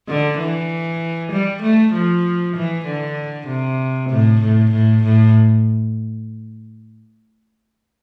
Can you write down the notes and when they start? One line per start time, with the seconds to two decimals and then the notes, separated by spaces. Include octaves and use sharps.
0.08 D3
0.39 E3
1.32 G3
1.63 A3
1.93 F3
2.56 E3
2.86 D3
3.48 C3
4.10 A2
4.41 A2
4.71 A2
5.03 A2